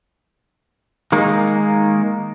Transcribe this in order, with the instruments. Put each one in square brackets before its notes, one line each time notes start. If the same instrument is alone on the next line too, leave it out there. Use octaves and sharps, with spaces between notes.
[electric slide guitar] D#3 G#3 A#3 D#4